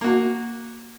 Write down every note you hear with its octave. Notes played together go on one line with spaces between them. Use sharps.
A#3 F#4